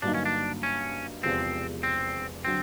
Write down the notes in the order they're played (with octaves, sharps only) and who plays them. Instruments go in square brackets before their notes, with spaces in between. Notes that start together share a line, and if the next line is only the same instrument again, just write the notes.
[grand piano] G2 D3 F#3 A#3 D#4 [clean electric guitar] D4
[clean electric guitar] C#4
D4
C#4
[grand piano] E1 E2 C3 F3 [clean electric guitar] C4
[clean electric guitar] C4
[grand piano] D3 F#3 [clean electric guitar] C4